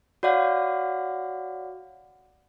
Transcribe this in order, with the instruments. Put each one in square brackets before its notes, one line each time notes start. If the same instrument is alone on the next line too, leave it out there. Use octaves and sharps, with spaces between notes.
[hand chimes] F#4 C#5 D5 F5 F#5